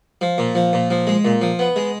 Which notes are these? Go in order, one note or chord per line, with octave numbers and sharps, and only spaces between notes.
F3
A#2
F3
A#2
F3
G#3
A#2
F3
B3
G#3